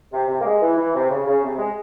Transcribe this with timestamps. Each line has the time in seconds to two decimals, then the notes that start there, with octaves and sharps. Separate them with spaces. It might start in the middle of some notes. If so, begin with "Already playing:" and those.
0.12 C3
0.28 C3
0.40 A#3
0.45 G#3
0.61 E3
0.77 E3
0.94 C3
1.10 C#3
1.26 C#3
1.43 C3
1.58 G#3